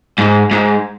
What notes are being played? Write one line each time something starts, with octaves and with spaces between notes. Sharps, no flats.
G#2
G#2